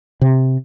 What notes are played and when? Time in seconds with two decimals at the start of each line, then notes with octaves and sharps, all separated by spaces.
0.21 C3